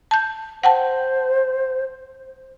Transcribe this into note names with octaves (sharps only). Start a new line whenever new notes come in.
A5 G6
C5 F#5 G5 A5